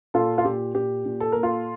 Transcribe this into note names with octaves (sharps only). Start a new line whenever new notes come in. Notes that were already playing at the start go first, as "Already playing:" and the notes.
A#2 F4 A4
F4
A#2 G4
A#2 G4
A#2
A4
A#3 A#4
F4 A4